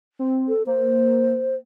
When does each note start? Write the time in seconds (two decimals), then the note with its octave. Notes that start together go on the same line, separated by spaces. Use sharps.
0.19 C4
0.48 A4
0.66 A#3 C5